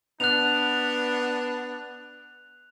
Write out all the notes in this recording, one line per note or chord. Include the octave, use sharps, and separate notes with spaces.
B3 D4 F#6 F7